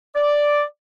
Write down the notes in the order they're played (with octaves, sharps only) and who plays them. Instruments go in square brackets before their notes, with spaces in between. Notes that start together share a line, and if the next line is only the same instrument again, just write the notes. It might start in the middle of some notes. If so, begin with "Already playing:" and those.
[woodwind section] D5